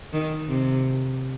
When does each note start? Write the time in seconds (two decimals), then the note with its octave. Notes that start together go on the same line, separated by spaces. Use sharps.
0.13 D#3
0.48 C3